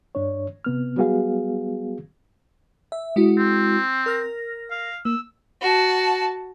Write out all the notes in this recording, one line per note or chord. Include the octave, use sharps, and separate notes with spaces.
G2 D4 C#5
C3 B3 F6
F#3 G3 B3 F#4 G#4 F5
E5
G#3 E4 F#4
C4
A#4 F6 A#6
F5
A#3 E6
F#4 A5